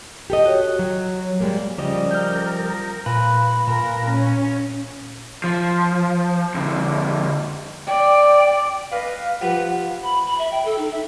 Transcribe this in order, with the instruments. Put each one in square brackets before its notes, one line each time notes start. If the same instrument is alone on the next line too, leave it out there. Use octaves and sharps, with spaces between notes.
[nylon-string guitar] G4 A4 D#5
[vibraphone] F#4 C#5
[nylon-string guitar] F#3
G3 G#3 A#3
[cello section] C#3 G4 [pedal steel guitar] F3 G3 D#5
[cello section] A#4 [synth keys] F6 G6
[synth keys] A#2 [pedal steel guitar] B4
[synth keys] A#2 [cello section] A#4
[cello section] C#4
[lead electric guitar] F3
F2 D3
[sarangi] D5 [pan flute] G5
[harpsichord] B4 D#5 [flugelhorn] F5
[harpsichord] F3 G4 B4 [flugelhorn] F#5
[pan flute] B5
B5
E5
G5
A4
D#4
E5